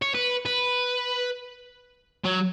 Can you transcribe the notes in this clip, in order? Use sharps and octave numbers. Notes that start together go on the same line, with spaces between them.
C#5
B4
B4
F#3